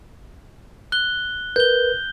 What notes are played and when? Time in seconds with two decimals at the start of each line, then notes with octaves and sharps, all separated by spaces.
0.92 F#6 G7
1.56 A#4 B4 G6 G7